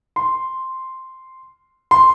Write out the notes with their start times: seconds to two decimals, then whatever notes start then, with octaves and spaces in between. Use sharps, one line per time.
0.16 C6
1.91 C6